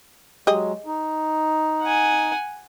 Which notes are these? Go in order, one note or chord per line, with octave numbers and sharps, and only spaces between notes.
F#3 G#3 G4 G#4 D#5
D#4
F#5 G#5